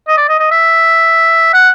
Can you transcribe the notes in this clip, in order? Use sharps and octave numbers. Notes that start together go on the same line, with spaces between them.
D#5
D5
D#5
D#5
E5
F#5